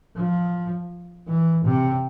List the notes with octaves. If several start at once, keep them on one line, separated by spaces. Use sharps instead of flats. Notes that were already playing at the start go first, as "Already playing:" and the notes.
F3
E3
C3